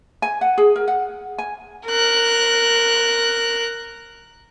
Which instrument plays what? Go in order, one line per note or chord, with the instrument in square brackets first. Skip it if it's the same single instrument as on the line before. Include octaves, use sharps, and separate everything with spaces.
[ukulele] G#5
F#5
G#4
A#4
F#5
G#5
[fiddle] A#4 F#6